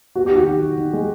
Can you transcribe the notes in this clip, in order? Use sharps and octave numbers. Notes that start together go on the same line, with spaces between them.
B3 F#4
G4
D#3 F#4
D#3
D#3
D#3
G#3